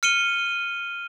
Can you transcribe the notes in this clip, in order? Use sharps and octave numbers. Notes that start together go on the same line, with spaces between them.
F6 C#7 D#7 G7